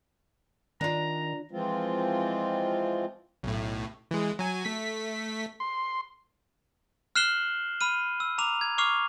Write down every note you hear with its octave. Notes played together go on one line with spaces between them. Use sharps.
D#3 D4 F4 A#5
E3 F3 G#3 C4 F4
B1 A2
E3 G#3
F#3 G#5
A3 B6
C6
F6 F#6 C7 E7 F#7 G7
B5 F6 D#7
E6
A#5 D6 F7
G#6
C#6 D6 F6 C7 F7